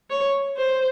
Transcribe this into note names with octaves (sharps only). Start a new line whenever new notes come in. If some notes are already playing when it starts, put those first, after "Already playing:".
C#5
C5